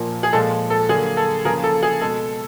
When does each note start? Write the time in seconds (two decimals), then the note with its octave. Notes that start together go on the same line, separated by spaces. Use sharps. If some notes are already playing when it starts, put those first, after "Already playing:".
Already playing: A#2 F3 A#3
0.23 G#4
0.33 A#2 F3 G#3 A4
0.70 A4
0.89 D3 F#3 A#3 G#4
1.17 A4
1.45 C#3 F3 A#3 G#4 A#4
1.64 A4
1.83 G#4
2.01 B2 G#3 A4